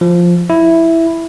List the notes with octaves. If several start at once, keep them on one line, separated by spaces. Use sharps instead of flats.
F3
E4